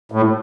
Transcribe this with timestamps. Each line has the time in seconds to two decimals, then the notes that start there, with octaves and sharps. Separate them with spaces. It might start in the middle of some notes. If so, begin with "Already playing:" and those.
0.12 A2